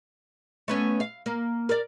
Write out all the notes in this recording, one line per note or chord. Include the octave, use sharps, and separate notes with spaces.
A3 B3 C#4
F5
A#3
A#4 D5